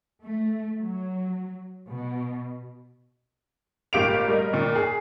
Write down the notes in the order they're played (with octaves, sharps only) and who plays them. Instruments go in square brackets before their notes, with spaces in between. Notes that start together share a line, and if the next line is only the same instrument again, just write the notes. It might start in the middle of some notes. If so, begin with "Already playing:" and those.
[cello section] A3
F#3
B2
[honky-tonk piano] G#1 A#2 G4 F5 D7 F7
G3 A#4 D#5
D#2 A#2
G#4